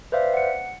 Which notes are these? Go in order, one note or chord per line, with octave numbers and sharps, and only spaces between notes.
B4 C5 D5 E5 F5
F#5 C#7